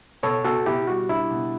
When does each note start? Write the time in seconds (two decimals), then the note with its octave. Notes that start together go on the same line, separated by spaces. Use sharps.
0.23 B2 A4 C#5
0.44 B2 F#4 A4
0.66 B2 E4 G4
0.88 G3 F#4
1.09 D4 E4
1.31 B2